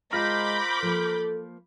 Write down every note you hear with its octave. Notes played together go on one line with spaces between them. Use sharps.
G#3 F4 A#4 C5 B5 D6 G6
F3 A#3 A4